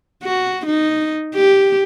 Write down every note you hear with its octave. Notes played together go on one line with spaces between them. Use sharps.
F#4
D#4
G4